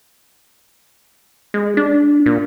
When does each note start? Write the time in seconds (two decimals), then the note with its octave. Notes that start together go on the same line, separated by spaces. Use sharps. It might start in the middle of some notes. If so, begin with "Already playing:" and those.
1.54 G#3
1.77 D4
2.26 A#2